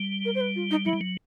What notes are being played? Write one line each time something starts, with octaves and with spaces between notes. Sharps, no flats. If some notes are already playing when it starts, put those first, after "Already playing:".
Already playing: G3
A#4
C5
B4
F4
D#4
F#3 E4
G3
F#3